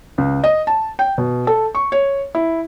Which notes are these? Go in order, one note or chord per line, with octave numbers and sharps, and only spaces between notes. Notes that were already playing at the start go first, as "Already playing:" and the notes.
C#2
D#5
A5
G5
B2
A4
C#6
C#5
E4